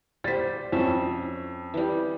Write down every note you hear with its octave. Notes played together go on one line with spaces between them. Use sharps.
G3 C5 A6 B6
F2 C#4 E5
E3 G3